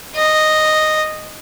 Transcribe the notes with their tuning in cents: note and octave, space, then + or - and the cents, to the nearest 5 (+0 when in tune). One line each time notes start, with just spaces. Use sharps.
D#5 -5